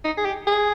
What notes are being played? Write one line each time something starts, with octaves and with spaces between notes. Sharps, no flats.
D#4
G#4
G4
G#4